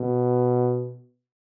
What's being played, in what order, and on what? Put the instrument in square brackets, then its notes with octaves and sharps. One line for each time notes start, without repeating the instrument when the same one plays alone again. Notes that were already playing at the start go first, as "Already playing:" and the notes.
Already playing: [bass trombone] B2